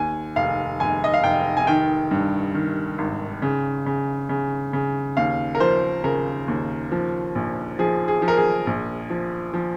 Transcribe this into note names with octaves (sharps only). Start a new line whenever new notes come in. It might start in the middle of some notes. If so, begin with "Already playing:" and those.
Already playing: D#2 G#5
F1 F5
F1 G#5
D#5
F5
F1 G5
G#5
D#3 G5
G2
D#3
G#1
C#3
C#3
C#3
C#3
D#2 F5
A#4
F3 C5
C#3 A#4
D#2
F3
A#1
F3 G#4
G#4
F3
A#4
G#4
A#1
F3
F3